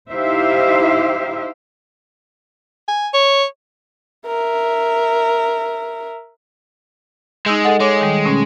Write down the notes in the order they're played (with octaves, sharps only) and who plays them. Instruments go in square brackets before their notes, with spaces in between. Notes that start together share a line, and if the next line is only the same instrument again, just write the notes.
[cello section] D#4 E4 G4 C5 E5 F5
[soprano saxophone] G#5
C#5
[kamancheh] A#4 E5
[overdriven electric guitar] G#3 [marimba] D#4 E6 G6
[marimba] A4 D#5 F#5
[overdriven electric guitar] G#3 [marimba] C#5 D6
[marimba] D#3 G3
B2 A3 C#4